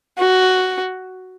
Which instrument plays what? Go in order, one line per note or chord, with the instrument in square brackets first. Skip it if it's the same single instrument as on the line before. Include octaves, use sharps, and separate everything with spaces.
[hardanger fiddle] F#4